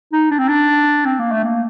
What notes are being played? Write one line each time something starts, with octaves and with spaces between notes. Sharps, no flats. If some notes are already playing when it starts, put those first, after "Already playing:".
D#4
D4
C4
D4
C4
A#3
A3
A#3